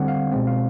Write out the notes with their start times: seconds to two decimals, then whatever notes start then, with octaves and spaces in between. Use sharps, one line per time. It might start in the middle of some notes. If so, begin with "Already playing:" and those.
Already playing: D3 G3 C4 F#5
0.08 F5
0.31 B2 G#3 C4
0.47 F5